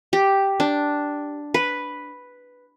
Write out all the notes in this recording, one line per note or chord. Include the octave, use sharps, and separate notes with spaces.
G4
D4
B4